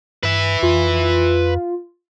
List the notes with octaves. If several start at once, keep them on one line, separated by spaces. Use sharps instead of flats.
G2 B4 E5
F2 F4